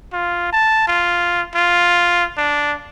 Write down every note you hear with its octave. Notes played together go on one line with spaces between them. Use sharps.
F4
A5
F4
F4
D4